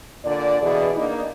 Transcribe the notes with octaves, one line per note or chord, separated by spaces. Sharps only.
A#2 D3 D5
B2 E3 G#4 D5
A#3 D4 D#4